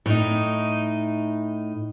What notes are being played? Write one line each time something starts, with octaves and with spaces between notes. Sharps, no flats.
A2 D#4